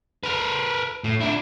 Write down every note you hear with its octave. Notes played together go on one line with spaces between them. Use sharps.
A#4 B4
A2
D4 E4